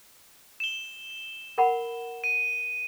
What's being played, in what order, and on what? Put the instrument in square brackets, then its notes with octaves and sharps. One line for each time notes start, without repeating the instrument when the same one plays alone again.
[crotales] E7 G7
[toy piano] A#4 F#5 B5
[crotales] D#7